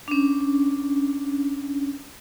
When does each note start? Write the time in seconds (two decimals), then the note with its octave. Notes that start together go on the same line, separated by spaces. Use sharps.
0.08 C#4 D4